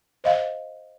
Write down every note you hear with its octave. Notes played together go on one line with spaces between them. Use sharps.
C5 D#5 F5